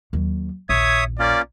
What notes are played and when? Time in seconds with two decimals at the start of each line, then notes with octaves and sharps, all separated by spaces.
0.13 D#2 F#3
0.69 A#1 D#2 C#5 E5 D#6 G#6
1.19 A#3 C#4 F4 D5